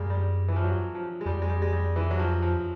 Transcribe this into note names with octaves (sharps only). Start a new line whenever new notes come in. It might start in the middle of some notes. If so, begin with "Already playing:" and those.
Already playing: F#2 G3 G#3 A#3
G3
E3
F3
F#3
F3
G#3
F2 G3
G#3
G3
G#3
G3
E3
F#3
F3
F3